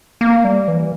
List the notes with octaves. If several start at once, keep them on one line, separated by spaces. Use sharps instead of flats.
A#3
G3
E3